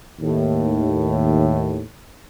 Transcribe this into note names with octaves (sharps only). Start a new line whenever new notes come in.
D#2 A2